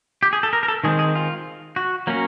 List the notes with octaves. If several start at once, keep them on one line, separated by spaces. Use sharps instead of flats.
G4
G#4
A4
A#4
A#4
A4
D#3 G#3 C4 G#4
G#4
F4
F#4
F#3 A#3 C#4